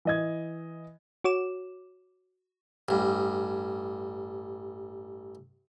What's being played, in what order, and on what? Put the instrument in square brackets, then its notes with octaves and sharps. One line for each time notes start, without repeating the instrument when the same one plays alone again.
[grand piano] E3 D#5 G#6
[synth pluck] F#4 C#5 D6 E7
[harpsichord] A1 G2